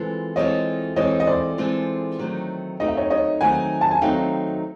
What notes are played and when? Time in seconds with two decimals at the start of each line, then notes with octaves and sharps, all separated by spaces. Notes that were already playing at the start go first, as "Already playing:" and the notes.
Already playing: E3 G#3 C4 F4 A4
0.36 E3 G#3 C4 F4 A4 C#5 D#5
0.96 E3 G#3 C4 F4 A4 C#5 D#5
1.20 D#5
1.27 C5 D5
1.58 E3 G#3 C4 F4 A4
2.19 D#3 F#3 A3 C4 D#4
2.80 D#3 F#3 A3 C4 D#4 D#5
2.88 E5
2.97 C#5 D#5
3.10 C#5 D#5
3.41 D#3 F#3 A3 C4 D#4 F#5 G#5
3.81 A5
3.91 G#5
4.01 D#3 F#3 A3 C4 D#4 F5 G5